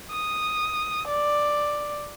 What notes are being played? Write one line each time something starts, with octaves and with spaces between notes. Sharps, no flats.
D#6
D5